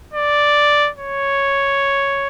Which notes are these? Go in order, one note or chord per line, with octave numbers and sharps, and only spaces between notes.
D5
C#5